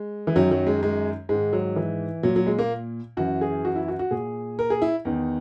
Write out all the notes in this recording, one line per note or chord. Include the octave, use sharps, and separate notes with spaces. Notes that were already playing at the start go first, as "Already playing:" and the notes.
Already playing: G#3
E3
F#2 D#3 F#3
F#3
G#3
G#3
G#2 G#3
D#3
F#3
E3
A#2 F#3
F#3
G#3
A#3
F#2 E3 F#4
G#4
F#4
E4
F#4
F#4
A#2 G#4
A#4
G#4
E4
E2 D#3